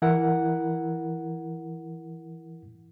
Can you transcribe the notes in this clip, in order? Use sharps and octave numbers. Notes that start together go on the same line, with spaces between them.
E3 E4 A#4 F#5